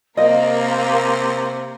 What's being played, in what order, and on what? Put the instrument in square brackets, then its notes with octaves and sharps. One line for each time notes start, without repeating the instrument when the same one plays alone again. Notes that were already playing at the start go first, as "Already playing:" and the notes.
[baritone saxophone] C3 [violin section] A#3 A#4 [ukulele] D#5 [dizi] F5